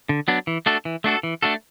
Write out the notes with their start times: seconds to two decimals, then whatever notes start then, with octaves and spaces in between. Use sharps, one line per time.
0.09 D3
0.28 F#3 B3 D4
0.47 E3
0.66 A3 D4 F#4 A4
0.85 E3
1.04 A3 D4 F#4 A4
1.23 E3
1.43 A3 D4 F#4 A4